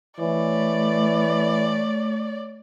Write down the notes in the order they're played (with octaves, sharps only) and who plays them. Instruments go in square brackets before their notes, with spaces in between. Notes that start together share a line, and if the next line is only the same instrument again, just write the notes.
[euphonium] E3 [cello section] A3 [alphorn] C#5 [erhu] D5